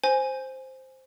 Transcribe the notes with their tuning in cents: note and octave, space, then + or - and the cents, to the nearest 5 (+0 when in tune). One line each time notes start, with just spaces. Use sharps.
C5 +0 G#5 +0